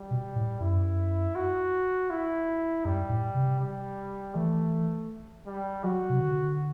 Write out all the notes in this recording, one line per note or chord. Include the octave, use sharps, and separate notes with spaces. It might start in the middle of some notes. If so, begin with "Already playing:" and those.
Already playing: G3
B2
A2
F#2 E4
F#4
E4
F#2 G3
A2
C3
G3
E3 A3
G3
F#3 F#4
C3
D3